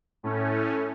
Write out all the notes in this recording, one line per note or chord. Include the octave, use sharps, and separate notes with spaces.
A2 A3 C#4